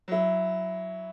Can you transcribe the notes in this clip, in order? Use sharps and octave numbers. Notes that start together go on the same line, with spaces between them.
F#3 E4